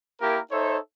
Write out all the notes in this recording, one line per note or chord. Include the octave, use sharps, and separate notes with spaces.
A#3 E4 G4 A#4
D#4 A4 C5 C#5 E5